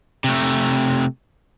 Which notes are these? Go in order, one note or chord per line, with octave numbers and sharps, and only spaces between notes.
C3 A3